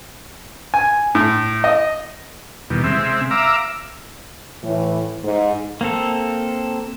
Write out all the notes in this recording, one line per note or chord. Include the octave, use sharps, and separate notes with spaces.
G#5
A2
D#5
E2 B2 D#3 G3
C3 G#3 C4 E5
E5 F5 A#5 D6 E6
A2 E3
G#2
A#3 C4 A4